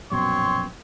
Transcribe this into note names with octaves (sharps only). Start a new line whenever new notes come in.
A#1 F#2 B2 C4 C#5 C6